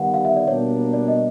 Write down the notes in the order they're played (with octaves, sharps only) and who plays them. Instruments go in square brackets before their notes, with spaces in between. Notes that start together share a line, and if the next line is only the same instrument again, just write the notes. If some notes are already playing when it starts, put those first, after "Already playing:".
Already playing: [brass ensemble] D#3 G3 B3 [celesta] F5 F#5
[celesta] F5
E5
D5
[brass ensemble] B2 G3 A#3 D4 [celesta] C#5
[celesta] D5
D#5